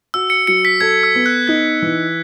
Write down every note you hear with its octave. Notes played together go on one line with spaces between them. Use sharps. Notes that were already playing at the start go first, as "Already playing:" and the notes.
F#4 E6
C#7
F#3 C#7
B6
A4 G#6
E6
B3
F#6
D#4 G#6
E3